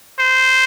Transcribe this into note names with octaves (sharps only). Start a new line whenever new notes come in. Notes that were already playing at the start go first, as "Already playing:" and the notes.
C5